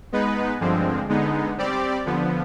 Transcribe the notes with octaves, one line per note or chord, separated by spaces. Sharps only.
G#3 B3 D#4 B4
G2 D3 F3 G#3 C4
D3 G#3 B3 D#4
G3 C4 G4 D5
D3 F3 B3